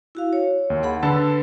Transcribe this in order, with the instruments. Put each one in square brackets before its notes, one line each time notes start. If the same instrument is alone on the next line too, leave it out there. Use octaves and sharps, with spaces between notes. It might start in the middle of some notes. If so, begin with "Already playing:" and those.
[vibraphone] E4 F#4 F5
C#5
[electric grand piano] D#2
[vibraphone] G#4 F#5 B5
[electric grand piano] D3 A4 A5 [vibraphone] B4